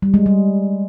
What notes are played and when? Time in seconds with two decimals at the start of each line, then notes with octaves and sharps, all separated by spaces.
0.02 G3
0.14 G#3
0.26 G3